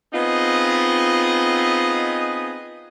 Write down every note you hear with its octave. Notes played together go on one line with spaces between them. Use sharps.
B3 C4 D#4 F4 G#4 D#5